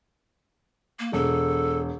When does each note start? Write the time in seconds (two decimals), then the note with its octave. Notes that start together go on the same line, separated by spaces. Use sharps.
0.99 A#3
1.13 E1 A4